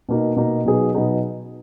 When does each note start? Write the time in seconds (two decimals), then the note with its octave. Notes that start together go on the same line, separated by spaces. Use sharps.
0.09 B2 A#3 D#4
0.36 B2 A#3 D#4
0.65 B2 F#3 B3 D#4 G#4
0.94 B2 F#3 B3 D#4 G#4